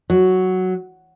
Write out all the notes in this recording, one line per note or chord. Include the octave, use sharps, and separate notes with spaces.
F#3